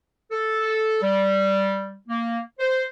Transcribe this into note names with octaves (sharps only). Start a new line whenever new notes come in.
A4
G3
A#3
C5